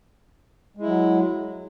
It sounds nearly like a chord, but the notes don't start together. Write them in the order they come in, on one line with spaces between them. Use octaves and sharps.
G#3 E4 F#3